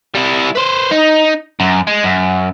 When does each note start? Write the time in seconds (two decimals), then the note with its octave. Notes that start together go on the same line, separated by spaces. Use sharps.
0.15 G3 E4
0.55 B4 C5
0.91 D#4
1.60 F#2
1.87 G#3
2.03 F#2